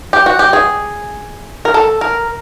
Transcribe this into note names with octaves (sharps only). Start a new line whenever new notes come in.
G4
F#4
G4
G#4
A#4
A4
A#4